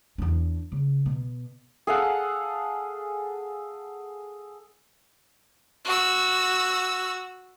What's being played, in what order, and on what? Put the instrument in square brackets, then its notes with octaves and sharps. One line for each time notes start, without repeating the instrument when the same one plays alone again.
[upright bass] E2 D4
C#3
B2
[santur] G#4 A4 F5 F#5
[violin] F#4 E6